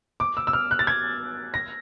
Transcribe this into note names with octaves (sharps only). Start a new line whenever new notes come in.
D6
E6
E6
F6
F#6
A6
G#6
A#6